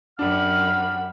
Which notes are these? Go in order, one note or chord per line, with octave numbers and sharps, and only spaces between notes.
F#2 G3 D4 F#5 B5 F6